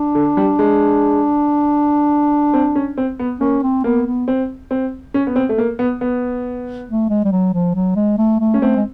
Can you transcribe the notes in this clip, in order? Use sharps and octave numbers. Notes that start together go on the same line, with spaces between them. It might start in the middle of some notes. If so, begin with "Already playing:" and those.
Already playing: D4
D3
G3
G#3
C4
C#4
C4
B3
A#3 C#4
C4
A#3 B3
B3
C4
C4
C#4
B3
C4
A3
A#3
B3
B3
A3
G#3
G3
F#3
F3
F#3
G#3
A3
A3
C#4
A3 C4
G#3